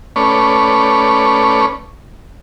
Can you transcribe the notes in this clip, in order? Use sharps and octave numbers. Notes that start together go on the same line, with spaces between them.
A3 C#4 B4 C#5 D5